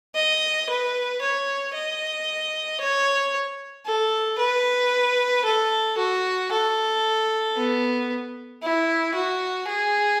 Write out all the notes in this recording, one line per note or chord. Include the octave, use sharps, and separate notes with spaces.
D#5
B4
C#5
D#5
C#5
A4
B4
A4
F#4
A4
B3
E4
F#4
G#4